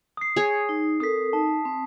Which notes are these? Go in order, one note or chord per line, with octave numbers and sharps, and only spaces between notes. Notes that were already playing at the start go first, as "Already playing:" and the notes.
D#6 C7
G#4 C#5
D#4
C4 A4 A#4 D#6 B6
D#4 A5
C4